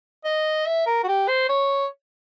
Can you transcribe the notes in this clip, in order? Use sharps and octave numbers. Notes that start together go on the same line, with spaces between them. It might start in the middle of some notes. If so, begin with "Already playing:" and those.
D#5
E5
A#4
F#4
G4
C5
C#5